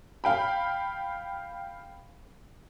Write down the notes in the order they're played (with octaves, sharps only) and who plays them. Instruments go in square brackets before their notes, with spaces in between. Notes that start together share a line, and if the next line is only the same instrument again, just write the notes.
[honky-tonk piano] F5 G5 B5